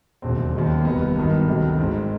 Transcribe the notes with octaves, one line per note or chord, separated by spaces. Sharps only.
E1 D#2 C#3 F#3 C4
D#2 D#3 F#3
A#3
F1 D#2 D#3 G3 B3
G#1 G2 D#3 F#3 B3
D2 C3 D#3 F#3
G#1 G#2 D#3 C4